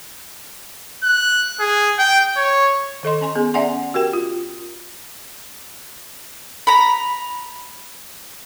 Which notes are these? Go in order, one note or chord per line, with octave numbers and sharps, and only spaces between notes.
F#6
G#4
G5
C#5
D#3 A4 D#5 C6
C#4 G#5 C6
B3 G#4
C#4 D5 E5 F#5 G#5 C6
F#4 G4 A#4 G5
F4
A#5 B5